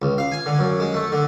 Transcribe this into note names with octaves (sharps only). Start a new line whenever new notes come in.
C#2
F5
G#5
D3
F#2
G#3
A3
D3